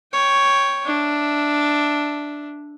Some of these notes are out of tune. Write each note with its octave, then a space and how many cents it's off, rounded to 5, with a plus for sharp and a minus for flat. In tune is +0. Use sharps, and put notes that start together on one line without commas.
C#5 +0 G5 +0
D4 +0 E5 -5